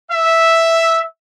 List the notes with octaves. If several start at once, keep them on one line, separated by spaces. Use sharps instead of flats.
E5